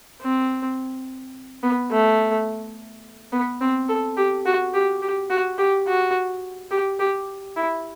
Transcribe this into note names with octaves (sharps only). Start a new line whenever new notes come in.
C4
B3
A3
B3
C4
A4
G4
F#4
G4
G4
F#4
G4
F#4
G4
G4
E4